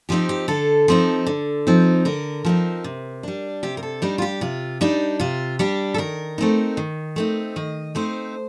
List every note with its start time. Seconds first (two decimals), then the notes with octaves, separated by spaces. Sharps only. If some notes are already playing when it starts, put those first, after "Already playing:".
0.09 F3 C4 D#4 G4
0.29 G4
0.48 D3 A4
0.88 F3 C4 D#4
1.27 D3
1.67 F3 C4 D#4
2.05 D3 A#4
2.45 F3 C4 D#4
2.84 C3
3.23 G3 D4
3.63 C3 G4
3.77 A#4
3.83 A4
4.02 G3 D4 D#4
4.18 F4
4.22 G4
4.41 C3 F4
4.81 G3 D4 D#4
5.20 C3 F4
5.59 G3 D4 G4
5.94 A4
5.98 D#3 A#4
6.38 A3 C4 D#4
6.77 D#3
7.16 A3 C4 D#4
7.56 D#3 D#5
7.95 A3 C4 D#4 C5